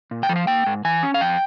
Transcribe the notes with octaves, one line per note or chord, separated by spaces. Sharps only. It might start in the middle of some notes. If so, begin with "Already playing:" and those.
A#2
G5
F3
F5
A#3 G5
G#2
E3 G#5
C#4
F5
F2 G5